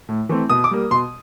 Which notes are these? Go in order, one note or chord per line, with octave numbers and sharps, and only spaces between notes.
A2
E3 A3 C4
B2 D#6
D6
G3 A#3
B2 C6